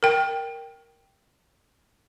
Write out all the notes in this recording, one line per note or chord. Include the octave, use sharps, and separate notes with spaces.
A#4 G5